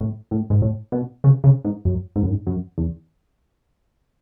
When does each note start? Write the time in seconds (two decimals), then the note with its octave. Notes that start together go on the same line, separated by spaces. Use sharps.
0.01 A2
0.31 A2
0.50 G#2
0.62 A2
0.92 B2
1.24 C#3
1.44 C#3
1.65 G#2
1.85 F#2
2.16 G#2
2.23 F#2
2.30 G#2
2.47 F#2
2.78 E2